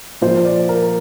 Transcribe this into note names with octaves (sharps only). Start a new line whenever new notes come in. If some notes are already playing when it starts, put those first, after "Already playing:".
A#2 F3 C5
D5
A#4